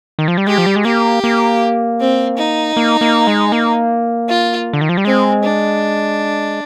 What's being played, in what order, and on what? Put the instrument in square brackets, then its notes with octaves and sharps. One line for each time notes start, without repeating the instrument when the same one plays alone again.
[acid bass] D#3
F3
G3
[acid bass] G#3 [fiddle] G4
[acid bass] F3
G3
G#3
[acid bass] A#3 [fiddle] G4
[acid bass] A#3
[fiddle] C4
D#4
[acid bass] A#3
A#3
G#3
A#3
[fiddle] F4
[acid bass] D3
D#3
F3
G3
[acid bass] G#3 [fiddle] C4
[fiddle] D4